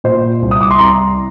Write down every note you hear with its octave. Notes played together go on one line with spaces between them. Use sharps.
A#2 C5
C2
D#6
D6
C6
C2 A#5